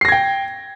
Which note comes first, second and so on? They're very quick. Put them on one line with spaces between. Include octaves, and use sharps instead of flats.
C7 A#6 G#6 G5